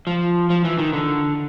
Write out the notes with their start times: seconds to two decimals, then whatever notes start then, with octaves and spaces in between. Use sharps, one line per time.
0.07 F3
0.50 F3
0.64 E3
0.78 D#3
0.93 D3